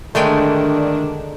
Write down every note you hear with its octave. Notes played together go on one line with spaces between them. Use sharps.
D3 D#3 G#3 A3 D4 G5